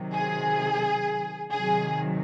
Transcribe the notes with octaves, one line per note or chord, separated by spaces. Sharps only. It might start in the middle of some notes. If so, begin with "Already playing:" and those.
Already playing: C3 D#3 F#3
G#4
C3 D#3 F#3 G#4